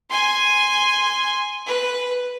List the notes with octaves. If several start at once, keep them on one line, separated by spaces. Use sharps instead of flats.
G#5 C6
B4